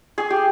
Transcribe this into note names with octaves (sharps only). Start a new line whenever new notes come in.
G#4
G4